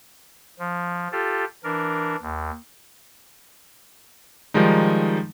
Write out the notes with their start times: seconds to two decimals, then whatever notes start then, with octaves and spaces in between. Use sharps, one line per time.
0.59 F3
1.12 F4 G4 A4
1.64 E3 D4 A#4
2.22 D#2
4.54 D#3 F3 G3 G#3 D#4